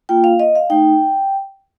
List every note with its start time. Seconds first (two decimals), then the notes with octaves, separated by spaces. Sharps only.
0.09 A#3 F4 G5
0.24 F5
0.40 D#5
0.55 F5
0.70 A3 D#4 G5